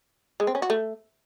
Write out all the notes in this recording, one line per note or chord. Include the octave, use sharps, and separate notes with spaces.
G#3
C4
C#4
F#4
A3